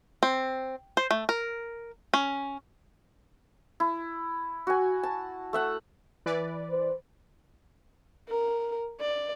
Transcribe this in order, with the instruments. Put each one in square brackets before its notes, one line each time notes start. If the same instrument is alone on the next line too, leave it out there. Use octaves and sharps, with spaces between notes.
[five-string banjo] C4
C5
A3
A#4
C#4
[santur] E4
F#4 G#5
A5
A3 E5 F#5
[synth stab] E3 B4 D5
[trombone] C5
[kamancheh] A#4
D5